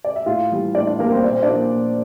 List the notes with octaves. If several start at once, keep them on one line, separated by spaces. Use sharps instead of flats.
D5
E5
A2 F4 F5
E3 G3
A2 D4 D5
D4 D5
E3 G3 A#3 A#4
C4 C5
A#2 D5
C5
D4 D5
F3 A#3
A#2